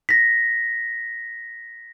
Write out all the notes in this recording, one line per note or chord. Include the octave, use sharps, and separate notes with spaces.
A#6 B6